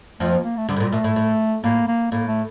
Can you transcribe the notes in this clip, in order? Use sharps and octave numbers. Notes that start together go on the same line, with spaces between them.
F2 F3 A3
A#3
A#3
A3
D2 D3 G3
A2
A#2
A#2 A3
A2
A2
A2 A#3
A#3
A2 A#3
A3